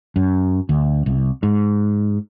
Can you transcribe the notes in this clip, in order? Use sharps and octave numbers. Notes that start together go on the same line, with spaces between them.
F#2
D2
C2
G#2